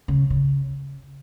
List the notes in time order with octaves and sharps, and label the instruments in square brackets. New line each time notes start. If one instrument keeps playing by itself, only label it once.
[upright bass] C#3
C#3